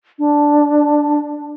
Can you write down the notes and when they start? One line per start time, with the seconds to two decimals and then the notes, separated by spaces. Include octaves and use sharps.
0.19 D4